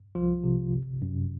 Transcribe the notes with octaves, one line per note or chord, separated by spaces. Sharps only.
C2 F3 F4
C3
G1
F#2